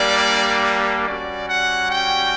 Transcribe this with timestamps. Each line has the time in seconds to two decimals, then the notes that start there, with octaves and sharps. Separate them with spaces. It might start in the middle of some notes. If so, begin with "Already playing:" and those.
Already playing: G3 A#3 D4 D5
1.07 G3 C#4 F#4 D5
1.49 F#5
1.91 G5